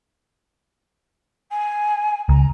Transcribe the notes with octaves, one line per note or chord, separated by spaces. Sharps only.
G#5
C#2 A#5